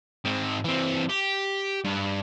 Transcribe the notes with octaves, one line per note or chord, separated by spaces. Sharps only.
G#2 C4
E3 C4
G4
G2